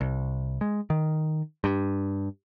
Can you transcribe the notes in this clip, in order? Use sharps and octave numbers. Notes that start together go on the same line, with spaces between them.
C2
G#3
D#3
G2